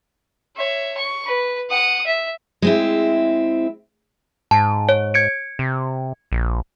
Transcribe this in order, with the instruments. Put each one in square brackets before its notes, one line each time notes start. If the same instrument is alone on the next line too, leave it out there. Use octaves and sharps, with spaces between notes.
[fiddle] C#5 E5
C#6
B4
F#5 D#6
E5
[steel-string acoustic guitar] G#3 C4 E4
[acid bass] G#2 [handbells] A5
[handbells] C#5
G#6 C#7 D7
[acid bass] C3
A#1